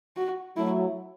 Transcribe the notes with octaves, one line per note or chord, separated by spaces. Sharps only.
F#4
F#3 A3 E4